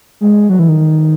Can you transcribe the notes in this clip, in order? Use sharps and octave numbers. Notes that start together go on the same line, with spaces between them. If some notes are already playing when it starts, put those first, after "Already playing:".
G#3
F#3
E3
D#3